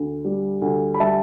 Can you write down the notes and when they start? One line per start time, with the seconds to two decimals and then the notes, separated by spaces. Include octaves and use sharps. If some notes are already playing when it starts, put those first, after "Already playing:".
Already playing: D2
0.25 G3
0.62 D2
0.94 B5
1.00 G3 E5 A5